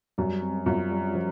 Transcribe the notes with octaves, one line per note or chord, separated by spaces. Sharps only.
F#2 G3
C4
F#2 F4
G3
F3